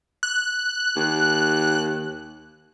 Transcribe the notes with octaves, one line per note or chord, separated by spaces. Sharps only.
F#6
D#2